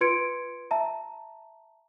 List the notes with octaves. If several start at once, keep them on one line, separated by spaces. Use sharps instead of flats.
F4 B4 C6 G#6 C#7 D7
E5 A5 A#5